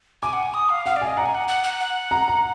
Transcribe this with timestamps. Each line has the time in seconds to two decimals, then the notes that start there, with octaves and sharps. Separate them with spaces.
0.22 G#5 D6
0.33 F#5
0.43 G#5
0.54 D#6
0.69 F5
0.86 F5 F#5
0.96 D5
1.02 G#5
1.07 D#5
1.17 F#5 A#5
1.26 G#5
1.35 F#5
1.48 F#5
1.64 F#5
1.80 F#5
2.11 A#5
2.28 A#5